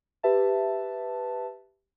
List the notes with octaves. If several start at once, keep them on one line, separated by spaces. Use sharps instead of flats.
G4 B4 E5 A5